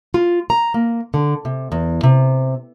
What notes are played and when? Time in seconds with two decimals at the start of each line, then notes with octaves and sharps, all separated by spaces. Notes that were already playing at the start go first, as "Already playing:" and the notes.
0.14 F4
0.50 A#5
0.74 A#3
1.14 D3
1.45 C3
1.72 E2
2.03 C3